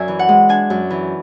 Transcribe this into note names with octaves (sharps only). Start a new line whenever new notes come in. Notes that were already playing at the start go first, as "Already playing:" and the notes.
Already playing: F#2 D5 E5 G#5
E3
F#5
G#3
D4 G#5
F#2
E3